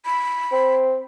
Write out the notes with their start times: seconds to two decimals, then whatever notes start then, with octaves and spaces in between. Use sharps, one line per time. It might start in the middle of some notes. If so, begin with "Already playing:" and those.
0.06 B5
0.52 C4